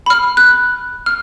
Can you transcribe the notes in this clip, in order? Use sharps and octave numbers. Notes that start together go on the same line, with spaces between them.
B5 F6
F#6
F6